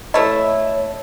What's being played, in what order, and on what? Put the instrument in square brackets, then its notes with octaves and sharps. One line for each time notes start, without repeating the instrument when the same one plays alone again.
[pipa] A3 E4 [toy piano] A4 B4 D#5 [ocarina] C#5